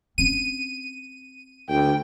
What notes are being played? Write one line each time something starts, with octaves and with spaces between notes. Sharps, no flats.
C4 C#4 D#7
D2 G5